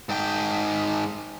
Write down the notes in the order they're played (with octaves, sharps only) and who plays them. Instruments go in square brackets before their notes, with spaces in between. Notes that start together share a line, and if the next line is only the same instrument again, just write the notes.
[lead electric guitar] G#2 G5